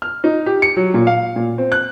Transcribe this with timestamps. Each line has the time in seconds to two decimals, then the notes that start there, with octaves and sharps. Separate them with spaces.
0.02 F6
0.24 D#4
0.46 G4
0.62 C#7
0.76 F#3
0.94 A#2
1.07 F5
1.36 A#2
1.58 C4
1.72 F#6